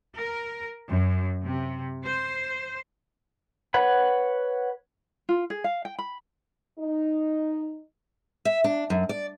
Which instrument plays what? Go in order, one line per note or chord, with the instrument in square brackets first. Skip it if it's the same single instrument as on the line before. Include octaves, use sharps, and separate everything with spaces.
[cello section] A#4
F#2
C3
C5
[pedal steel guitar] B4 C#5 F#5 B5
[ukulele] F4
G#4
F5
G5
B5
[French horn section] D#4
[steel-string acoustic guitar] E5
D4
F#2
D5